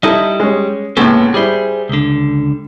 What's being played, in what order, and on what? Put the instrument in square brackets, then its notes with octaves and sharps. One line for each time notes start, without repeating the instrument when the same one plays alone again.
[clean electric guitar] G3 D#5 [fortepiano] D#4 E4 A4
[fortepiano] G#3 C#4
[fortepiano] C#2 A2 [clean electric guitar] A#3 B3 A4
[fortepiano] G3 E4 [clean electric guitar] G#4 C5
[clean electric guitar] C#2 D3